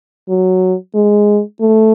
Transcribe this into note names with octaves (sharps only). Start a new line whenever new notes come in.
F#3
G#3
A3